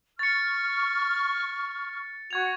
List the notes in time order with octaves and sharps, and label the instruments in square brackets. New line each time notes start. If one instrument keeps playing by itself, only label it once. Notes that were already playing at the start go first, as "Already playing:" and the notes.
[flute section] C#6 F6 [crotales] A6 C#7
[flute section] F#4 [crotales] C#6 G#6 F7